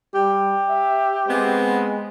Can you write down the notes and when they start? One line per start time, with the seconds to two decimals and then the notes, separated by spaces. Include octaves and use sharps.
0.15 G3 G4
0.69 E5
1.28 G#3 B3 C4